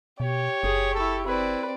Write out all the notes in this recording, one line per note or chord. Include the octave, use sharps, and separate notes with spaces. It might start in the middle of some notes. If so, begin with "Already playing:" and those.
B2 G4 C#5
F#1 G#4 D#6
E4 A4 C#6
C4 E4 B4 D5